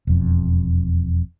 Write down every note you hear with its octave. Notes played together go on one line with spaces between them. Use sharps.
E1 F2